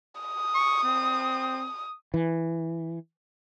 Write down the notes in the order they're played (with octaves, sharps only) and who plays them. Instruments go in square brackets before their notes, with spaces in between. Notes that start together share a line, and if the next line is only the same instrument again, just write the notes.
[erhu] D#6
[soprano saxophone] C#6
C4
[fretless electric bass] E3